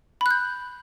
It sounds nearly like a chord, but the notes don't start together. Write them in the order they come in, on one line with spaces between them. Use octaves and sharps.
B5 F#6 G6